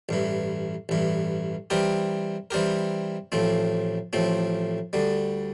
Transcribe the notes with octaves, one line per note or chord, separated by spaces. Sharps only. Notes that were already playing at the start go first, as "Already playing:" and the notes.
A1 G2 E3
A1 G2 E3
E3 G3 C4 G4 A#4
E3 G3 C4 G4 A#4
A1 A2 F3 C4
A1 A2 F3 C4
D2 D3 G3